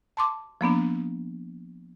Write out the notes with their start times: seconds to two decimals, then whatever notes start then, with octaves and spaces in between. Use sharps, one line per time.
0.17 A5 C6 D6
0.61 F3 A#3 B3 D4